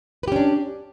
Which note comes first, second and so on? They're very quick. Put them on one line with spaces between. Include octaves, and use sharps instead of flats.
B4 G4 C#4 D4